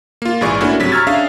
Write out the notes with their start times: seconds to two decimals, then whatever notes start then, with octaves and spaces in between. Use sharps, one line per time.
0.22 A#3 F4
0.41 A#1 G#2 E3 G#4 D5 C#6
0.61 A3 A#3 C#4 D4 E4 F#4
0.80 G2 C3 F#3 B6
0.92 A#5 C#6 E6 F6 G#6 A6
1.07 C#4 D4 G#4 E5 F5